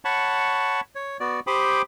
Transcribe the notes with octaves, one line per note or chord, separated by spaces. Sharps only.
C#5 F#5 A5 B5 C#6
C#5
B3 F#4 D5
G4 C5 G5 B5 D6 D#6